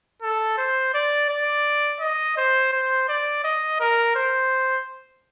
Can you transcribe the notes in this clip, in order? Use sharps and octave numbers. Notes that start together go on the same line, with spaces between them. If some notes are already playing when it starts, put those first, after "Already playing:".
A4
C5
D5
D5
D#5
C5
C5
D5
D#5
A#4
C5